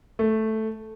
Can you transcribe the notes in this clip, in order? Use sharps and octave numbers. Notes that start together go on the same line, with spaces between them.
A3